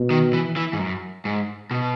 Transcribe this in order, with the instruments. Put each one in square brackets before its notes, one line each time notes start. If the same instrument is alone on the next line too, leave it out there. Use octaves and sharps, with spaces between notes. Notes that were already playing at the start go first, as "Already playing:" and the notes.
Already playing: [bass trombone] B2
[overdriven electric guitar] D#3
E3
E3
G#2
F#2
G#2
B2